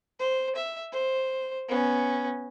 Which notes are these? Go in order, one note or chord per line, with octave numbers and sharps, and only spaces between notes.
C5
E5
C5
B3 C#4